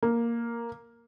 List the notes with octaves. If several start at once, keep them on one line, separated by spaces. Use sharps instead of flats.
A#3